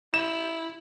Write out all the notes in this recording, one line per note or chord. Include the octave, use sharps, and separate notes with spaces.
E4 E7